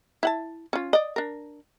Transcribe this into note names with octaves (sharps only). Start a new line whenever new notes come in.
E4 F#5 A5
C#4 F4
D5 D#5
D4 A#4